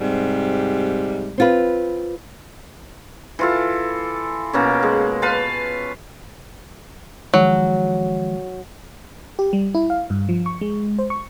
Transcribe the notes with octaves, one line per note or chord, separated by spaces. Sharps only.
G#2 C3 G3
C4 F4 B4
E3 F4 A4
B2 A#3 C#4
G#3
B4 F5 A5
D#3 F3 F#3 G#3
G4
G3
E4
F5
G2
F3
C#6
G#3
C5
C#6